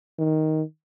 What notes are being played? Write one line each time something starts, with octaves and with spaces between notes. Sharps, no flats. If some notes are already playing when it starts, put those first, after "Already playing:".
D#3